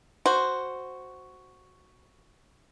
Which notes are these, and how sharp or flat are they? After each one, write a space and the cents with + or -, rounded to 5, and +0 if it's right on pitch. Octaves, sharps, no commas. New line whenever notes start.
F#4 +0 C5 +0